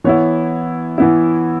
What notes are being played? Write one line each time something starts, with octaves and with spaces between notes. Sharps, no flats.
E3 B3 E4 C#5
E3 B3 E4